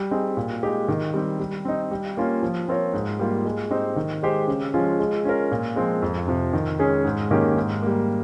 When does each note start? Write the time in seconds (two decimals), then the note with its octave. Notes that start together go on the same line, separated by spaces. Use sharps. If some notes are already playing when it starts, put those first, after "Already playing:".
Already playing: G3
0.11 C4 D#4 G#4
0.37 A#2
0.63 G#3 D#4 G4
0.88 D#3
1.14 G3 C4 G4
1.39 G3
1.65 C4 D#4
1.91 G3
2.17 A#3 C#4 F4
2.43 F3
2.68 C4 F4 A#4 C#5
2.93 G#2
3.19 G3 A#3 F4
3.45 G#3
3.71 C4 D#4 G4 C5
3.96 D#3
4.23 G#3 D#4 G4 C5
4.48 C#3
4.74 F3 G#3 C#4 F4
5.00 G#3
5.25 C#4 F4 A#4
5.51 A#2
5.76 F3 G#3 C4
6.02 F2
6.28 C3 F3
6.53 D#3
6.79 G#3 C#4 G#4
7.05 G#2
7.31 D#3 A#3 C#4 G4
7.56 G#2
7.82 G3 A#3